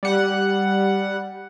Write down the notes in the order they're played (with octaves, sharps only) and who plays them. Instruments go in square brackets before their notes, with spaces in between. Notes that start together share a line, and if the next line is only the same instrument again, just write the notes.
[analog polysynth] G3 F#5